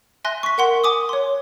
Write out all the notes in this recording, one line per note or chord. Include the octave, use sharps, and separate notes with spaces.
E5 G#5 C6 F#6 A#6
C#6 B6
A#4 F#5 C6
G#5 D6 D#6
C#5 C6